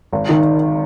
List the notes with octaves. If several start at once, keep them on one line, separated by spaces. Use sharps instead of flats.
G#1
D#3